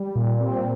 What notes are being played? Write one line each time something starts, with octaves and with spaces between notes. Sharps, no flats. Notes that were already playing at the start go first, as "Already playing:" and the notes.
Already playing: G3
A#2
C4